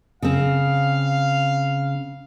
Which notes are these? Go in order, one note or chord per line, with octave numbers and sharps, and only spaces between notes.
C#3 C4 F5